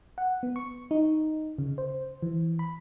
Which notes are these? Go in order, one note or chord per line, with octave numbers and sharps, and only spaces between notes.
F#5
B3
C#6
D#4
C#3
C5
E3
B5